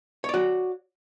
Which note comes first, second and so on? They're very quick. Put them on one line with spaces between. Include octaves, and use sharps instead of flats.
C#5 D5 F#4